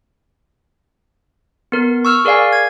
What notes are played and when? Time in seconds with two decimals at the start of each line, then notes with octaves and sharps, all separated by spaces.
1.72 B3 A#4
2.05 C#6 E6 F6
2.25 G#4 A#4 D5 F5 G#5
2.53 G#6